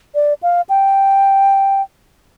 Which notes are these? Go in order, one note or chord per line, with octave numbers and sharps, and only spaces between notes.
D5
F5
G5